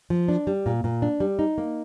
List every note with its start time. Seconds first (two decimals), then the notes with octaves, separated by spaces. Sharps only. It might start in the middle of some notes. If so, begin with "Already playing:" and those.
0.10 F3
0.28 D4
0.47 G3
0.66 A#2
0.84 A#2
1.02 D4
1.20 G3
1.39 D#4
1.58 A#3